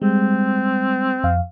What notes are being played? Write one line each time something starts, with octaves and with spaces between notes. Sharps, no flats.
G3 G#3 C4
F2 F5